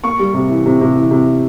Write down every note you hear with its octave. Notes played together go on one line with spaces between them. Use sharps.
A#3 C#6
G3
C3
E3
C3
C3
E3
C3